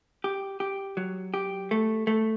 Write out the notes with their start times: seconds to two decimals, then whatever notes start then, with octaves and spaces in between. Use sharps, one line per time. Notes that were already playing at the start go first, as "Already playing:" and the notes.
0.24 G4
0.60 G4
0.97 F#3
1.34 G4
1.71 A3
2.07 A3